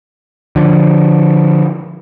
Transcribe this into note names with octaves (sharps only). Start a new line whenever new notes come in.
D3 F3